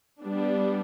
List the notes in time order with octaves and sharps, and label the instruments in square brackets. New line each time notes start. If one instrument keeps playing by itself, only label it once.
[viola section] G3 B3 D4